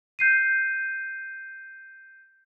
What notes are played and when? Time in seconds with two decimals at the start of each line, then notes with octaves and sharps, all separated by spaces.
0.19 G6 C7 D#7